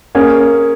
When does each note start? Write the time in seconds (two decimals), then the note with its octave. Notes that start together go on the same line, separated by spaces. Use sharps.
0.15 A#3 C#4 G#4